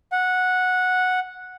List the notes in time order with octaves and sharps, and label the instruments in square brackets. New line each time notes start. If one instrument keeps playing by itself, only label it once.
[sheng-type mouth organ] F#5